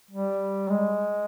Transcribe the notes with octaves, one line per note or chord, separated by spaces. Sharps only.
G3
G#3